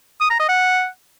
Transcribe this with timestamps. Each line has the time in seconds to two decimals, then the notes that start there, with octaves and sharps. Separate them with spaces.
0.21 D#6
0.30 A#5
0.40 D#5
0.49 F#5